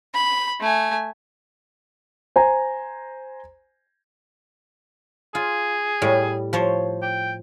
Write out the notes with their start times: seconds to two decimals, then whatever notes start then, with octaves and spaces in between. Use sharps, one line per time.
0.14 B5
0.61 A3 G#5
2.36 C5 G#5 A#5
5.35 F4 G#4
6.02 A2 G3
6.53 F3 C5 C#5
7.02 G5